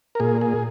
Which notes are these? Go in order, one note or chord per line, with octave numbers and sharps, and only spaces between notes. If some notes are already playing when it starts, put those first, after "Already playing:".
A#4
A#2 G#4
G#4